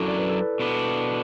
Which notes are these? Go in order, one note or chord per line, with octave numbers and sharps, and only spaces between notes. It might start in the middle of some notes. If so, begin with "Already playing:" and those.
Already playing: F#2 F#3 D4 E4 A4
D5
B4
A4
B4
B2 B3 D4